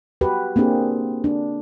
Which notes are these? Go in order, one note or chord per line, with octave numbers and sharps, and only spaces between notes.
F#4 G4 B4
A#3 C4 D4 G4 G#4
D4